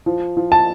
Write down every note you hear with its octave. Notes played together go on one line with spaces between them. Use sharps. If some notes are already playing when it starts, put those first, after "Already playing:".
F3
F3
A5